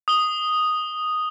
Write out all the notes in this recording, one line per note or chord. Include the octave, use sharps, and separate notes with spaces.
D#6 G7